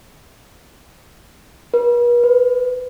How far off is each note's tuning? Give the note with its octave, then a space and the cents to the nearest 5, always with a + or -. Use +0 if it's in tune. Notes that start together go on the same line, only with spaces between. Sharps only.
B4 -45
B4 +25